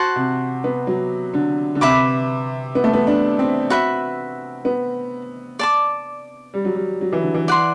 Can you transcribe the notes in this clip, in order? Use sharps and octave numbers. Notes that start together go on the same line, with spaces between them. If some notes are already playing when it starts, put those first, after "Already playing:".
Already playing: F#4 C5 F#5 A5
C3
B3
F#3
D3
D3
C3 B4 E5 B5 D6
B3
A3
B3
D4
C4
F#4 B4 E5
B3
D5 A5 D6
G3
F#3
G3
F#3
E3
D3
E3
D5 F#5 C6